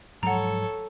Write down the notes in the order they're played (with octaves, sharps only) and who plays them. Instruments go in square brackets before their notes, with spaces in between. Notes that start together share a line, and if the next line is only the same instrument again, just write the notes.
[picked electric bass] G#2 F3 F#3 [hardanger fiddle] A4 C#5 [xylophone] F#5 A#5